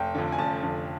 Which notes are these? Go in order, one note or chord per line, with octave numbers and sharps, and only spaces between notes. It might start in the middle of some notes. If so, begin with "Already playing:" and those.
Already playing: F1 G5
F2 D3
G#5
F1 A5
F2 D3